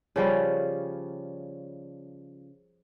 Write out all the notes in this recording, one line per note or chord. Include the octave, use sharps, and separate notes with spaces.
C#3 F3 G3 C#4